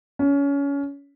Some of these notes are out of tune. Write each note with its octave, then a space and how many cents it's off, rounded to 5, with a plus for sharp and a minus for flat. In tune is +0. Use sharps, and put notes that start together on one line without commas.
C#4 +25